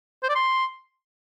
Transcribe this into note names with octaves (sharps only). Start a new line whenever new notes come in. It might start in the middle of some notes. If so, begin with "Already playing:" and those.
C5
D5
C6